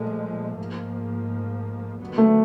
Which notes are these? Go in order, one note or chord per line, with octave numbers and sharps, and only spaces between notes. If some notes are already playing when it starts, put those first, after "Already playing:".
Already playing: A#2 F3 G#3 A3
G#2 F3 A#3
D#2 D3 F#3 B3
A3